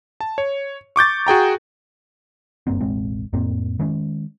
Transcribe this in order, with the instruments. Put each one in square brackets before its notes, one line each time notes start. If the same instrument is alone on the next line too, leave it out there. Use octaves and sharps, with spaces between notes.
[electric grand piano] A5
C#5
C#6 D6 G6 A6
F#4 G#4 G5 A#5
[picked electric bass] F#1 G2 A#3 C4
E1 A1 G#3 C4
F2 A2 A#3 C4
D#3 G#3 C#4